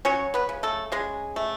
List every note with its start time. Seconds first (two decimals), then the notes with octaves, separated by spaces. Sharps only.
0.05 F#3 C#4 C#5
0.34 B3 B4
0.49 C#3
0.63 A3 A4
0.92 C#3 G#3 G#4
1.36 A3